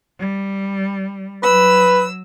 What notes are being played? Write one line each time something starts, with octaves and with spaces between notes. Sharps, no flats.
G3
F#3 B4 E6